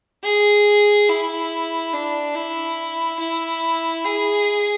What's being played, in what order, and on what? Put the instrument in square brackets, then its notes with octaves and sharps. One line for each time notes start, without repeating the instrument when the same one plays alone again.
[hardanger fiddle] G#4
E4
D4
E4
E4
G#4